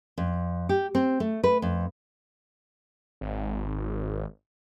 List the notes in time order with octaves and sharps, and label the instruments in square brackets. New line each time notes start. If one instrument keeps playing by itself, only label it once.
[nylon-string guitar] F2
G4
C4
A3
B4
F2
[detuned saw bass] G#1